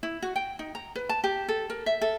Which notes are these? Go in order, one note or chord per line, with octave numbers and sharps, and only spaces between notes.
E4
F#4
G5
D#4
A#5
B4
A5
G4
A4
A#4
E5
A4